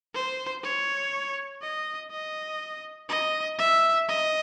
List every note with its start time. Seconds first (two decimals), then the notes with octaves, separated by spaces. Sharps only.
0.15 C5
0.63 C#5
1.62 D#5
2.11 D#5
3.09 D#5
3.58 E5
4.08 D#5